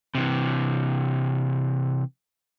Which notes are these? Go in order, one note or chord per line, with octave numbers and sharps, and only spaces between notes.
C3 E3